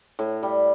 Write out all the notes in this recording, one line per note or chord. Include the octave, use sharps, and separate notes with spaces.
A2
G3